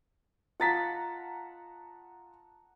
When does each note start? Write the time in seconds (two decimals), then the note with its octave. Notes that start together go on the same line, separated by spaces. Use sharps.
0.60 F4 F#5 A5 A#5 A6 B6